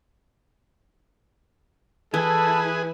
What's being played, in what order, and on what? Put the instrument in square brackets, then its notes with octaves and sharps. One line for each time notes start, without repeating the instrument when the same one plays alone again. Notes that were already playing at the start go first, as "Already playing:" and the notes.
[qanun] E3 [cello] E4 [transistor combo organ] G#4 B4 G#5 [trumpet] A4